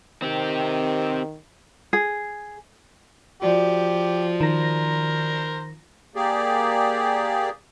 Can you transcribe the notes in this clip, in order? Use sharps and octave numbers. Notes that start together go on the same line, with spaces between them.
D#3 C4 G4
G#4
F3 F#4 G4 D5
D#3 A#4 C5 A#6
A#3 G4 G#4 D5